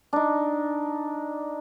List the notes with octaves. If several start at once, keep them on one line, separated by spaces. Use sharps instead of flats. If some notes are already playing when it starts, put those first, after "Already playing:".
D4 D#4